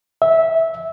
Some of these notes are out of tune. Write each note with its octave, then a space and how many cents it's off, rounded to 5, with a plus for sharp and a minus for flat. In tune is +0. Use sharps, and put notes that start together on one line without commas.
E5 -15